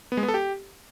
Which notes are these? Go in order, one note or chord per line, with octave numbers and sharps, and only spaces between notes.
B3
G#3
B3
A4
G4